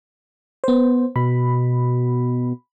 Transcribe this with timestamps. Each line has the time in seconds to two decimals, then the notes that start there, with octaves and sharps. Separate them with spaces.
0.64 B3 C5
1.16 B2 B5